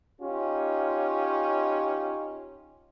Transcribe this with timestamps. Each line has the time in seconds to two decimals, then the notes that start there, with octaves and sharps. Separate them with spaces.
0.21 C#4 D#4 F4 G4